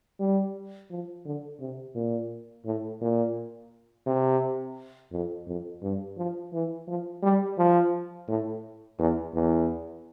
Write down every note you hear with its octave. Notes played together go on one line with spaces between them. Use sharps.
G3
F3
D3
C3
A#2
A2
A#2
C3
F2
F2
G2
F3
E3
F3
G3
F3
A2
E2
E2